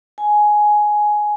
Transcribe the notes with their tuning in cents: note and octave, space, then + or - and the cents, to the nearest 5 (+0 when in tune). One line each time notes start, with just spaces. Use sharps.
G#5 +10